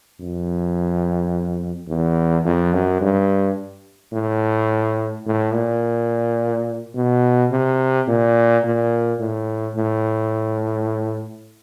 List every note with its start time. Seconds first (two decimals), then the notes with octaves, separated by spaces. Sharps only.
0.20 F2
1.89 E2
2.45 F2
2.74 F#2
3.02 G2
4.13 A2
5.26 A2
5.54 A#2
6.95 B2
7.51 C3
8.08 A#2
8.64 A#2
9.20 A2
9.76 A2